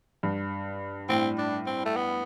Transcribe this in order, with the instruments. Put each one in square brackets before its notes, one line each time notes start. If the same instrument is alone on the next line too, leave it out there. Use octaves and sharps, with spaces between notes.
[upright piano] G2
[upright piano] A2 [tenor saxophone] C4
[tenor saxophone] D4
C4
A3
B3